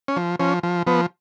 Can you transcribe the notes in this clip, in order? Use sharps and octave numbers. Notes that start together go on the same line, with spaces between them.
C#4
F3
F3 C#4
F3
F3 B3